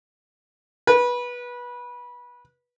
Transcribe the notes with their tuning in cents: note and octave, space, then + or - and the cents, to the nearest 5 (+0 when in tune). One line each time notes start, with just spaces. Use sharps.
B4 -20